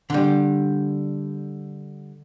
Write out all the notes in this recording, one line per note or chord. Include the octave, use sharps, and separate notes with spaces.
D3 G3